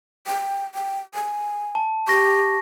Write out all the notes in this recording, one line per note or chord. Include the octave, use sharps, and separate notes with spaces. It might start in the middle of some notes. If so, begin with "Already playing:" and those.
G5
G5
G#5
A5
G4 C#6 A#6